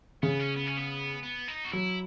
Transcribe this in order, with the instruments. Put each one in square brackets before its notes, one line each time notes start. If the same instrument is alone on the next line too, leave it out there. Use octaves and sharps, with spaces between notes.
[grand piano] C#3 [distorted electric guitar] B3
[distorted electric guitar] C#4
B3
C#4
B3
B3
D#4
F#4
[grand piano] F#3 [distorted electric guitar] E4